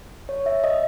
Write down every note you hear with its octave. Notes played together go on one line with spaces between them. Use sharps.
C#5
E5
D#5